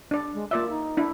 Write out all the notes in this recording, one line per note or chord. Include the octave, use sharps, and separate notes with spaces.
D4 D5
G#3
A#3 F4 D5 E5
D#4
D4 E4